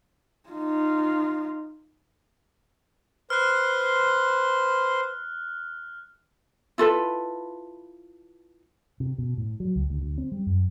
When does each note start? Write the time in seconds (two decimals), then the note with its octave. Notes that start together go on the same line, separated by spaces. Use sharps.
0.50 D#4 F4
3.30 B4 C5 C6 F6 F#6
6.78 E4 F4 A4 B4
9.00 C3
9.18 B2
9.38 A2
9.60 F#3
9.76 C#2
9.90 D2
10.02 D2
10.18 C4
10.32 G3
10.46 F#2